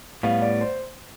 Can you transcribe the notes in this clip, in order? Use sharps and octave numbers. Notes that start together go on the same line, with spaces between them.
A2 G3 B3 F5
D5
C5